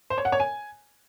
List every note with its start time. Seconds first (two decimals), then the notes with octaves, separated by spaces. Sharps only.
0.10 C5
0.18 C#5
0.25 F#5
0.32 C#5
0.40 G#5